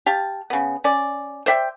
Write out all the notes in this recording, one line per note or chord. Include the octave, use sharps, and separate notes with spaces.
G4 F5 A5
C#3 B3
C#4 D5
C5 D5 E5 G5